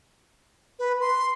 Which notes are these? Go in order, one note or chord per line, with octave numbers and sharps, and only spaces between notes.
B4
C6